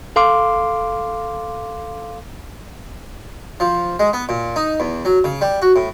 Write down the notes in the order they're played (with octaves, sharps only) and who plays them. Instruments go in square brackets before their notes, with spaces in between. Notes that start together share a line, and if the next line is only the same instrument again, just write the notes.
[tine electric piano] A4 F5 C6 D6
[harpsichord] F3
G#3
B3
A#2
D#4
E2
F#3
C#3
G3
F#4
A2